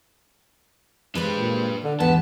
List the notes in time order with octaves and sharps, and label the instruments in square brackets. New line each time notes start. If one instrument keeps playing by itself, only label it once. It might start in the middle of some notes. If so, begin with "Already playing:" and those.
[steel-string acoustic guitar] G#3 G4 C5 [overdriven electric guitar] D4 B4
[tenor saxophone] A#2
D3
[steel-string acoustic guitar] E2 G#2 G4 [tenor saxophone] B3 [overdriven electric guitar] A5